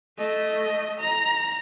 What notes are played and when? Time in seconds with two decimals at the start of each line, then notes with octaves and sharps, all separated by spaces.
0.18 A3 D#5
1.00 A#5